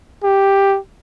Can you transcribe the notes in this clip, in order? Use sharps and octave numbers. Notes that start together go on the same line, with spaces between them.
G4